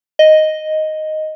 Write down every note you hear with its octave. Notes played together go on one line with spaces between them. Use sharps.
D#5